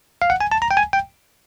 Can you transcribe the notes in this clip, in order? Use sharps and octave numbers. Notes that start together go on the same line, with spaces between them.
F5
F#5
G#5
A5
A#5
G5
G#5
G5